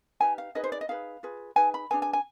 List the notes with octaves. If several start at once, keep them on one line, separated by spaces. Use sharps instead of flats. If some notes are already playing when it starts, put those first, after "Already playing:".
D#4 G4 B4 G#5
F5
D#4 G#4 B4 D#5
C5
D5
D#5
D#4 G#4 B4 F5
F4 G#4 B4
D#4 G#4 B4 G#5
B5
D4 F4 G#4 B4 G#5
G#5
G#5